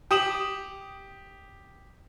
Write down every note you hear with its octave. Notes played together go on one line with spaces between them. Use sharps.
G4 D#6 E7 F#7